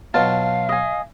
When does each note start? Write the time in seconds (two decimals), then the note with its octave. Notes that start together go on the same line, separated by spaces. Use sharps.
0.14 B2 F#3 F4 F5 A5
0.69 D#5 G#5